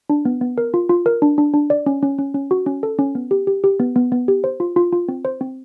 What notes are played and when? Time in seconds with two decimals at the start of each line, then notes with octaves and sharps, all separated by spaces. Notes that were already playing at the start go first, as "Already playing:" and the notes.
0.10 D4
0.25 B3
0.41 B3
0.58 A#4
0.74 F4
0.89 F4
1.06 A#4
1.22 D4
1.38 D4
1.54 D4
1.70 D5
1.86 C#4
2.03 C#4
2.18 C#4
2.35 C#4
2.51 F#4
2.66 C#4
2.83 A4
2.99 C#4
3.15 B3
3.31 G4
3.47 G4
3.64 G4
3.80 B3
3.96 B3
4.12 B3
4.28 G4
4.44 C5
4.60 F4
4.76 F4
4.92 F4
5.09 C4
5.25 C5
5.41 C4